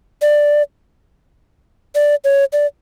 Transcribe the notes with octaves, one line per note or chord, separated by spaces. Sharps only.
D5
D5
C#5
D5